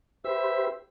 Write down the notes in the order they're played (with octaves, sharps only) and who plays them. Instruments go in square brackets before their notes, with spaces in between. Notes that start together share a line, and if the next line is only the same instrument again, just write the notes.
[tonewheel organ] G4 B4 C5 [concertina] E5 E6